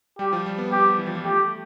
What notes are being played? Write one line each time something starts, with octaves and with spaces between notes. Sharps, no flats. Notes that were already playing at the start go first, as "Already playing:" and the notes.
G3 G4
F3
G3
B3
B3 G4
E3
F3
G3
A3 G4